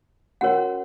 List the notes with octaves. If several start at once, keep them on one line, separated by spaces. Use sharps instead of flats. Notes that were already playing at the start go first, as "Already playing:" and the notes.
C#4 F#4 A#4 C#5 F#5